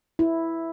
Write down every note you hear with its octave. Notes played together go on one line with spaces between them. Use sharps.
E4